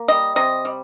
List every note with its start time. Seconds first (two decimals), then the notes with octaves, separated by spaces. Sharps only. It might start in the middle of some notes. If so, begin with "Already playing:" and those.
Already playing: A#3
0.08 G3 D#5
0.36 C3 D#5
0.65 G3